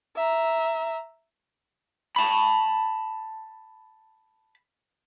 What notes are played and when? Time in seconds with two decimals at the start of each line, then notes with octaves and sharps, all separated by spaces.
0.16 E5 A#5
2.16 A5 B5